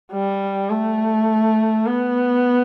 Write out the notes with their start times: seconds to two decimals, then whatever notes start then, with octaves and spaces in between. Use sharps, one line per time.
0.12 G3
0.70 A3
1.86 B3